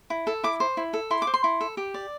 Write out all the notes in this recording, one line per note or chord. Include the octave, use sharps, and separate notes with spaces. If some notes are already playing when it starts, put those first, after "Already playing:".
E4
A4
E4 D6
C5
E4
A4
E4 C6
D6
C5
C6
E4
A4
G4
D5